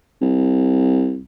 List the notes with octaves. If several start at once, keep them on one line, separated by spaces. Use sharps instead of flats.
C2